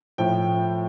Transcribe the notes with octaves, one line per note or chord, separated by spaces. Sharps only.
A2 F3 G5